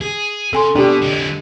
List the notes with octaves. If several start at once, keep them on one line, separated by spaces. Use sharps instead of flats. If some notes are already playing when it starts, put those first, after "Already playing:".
G#4
C#3 A4 G#5 C6
B2 D4 G4
D3 G#3